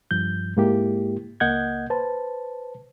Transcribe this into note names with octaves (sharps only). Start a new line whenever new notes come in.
G2 F3 G6
G#2 G#3 A#3 E4 G4
C#2 A#3 D#5 F#5 G6 G#6
B4 C5 A5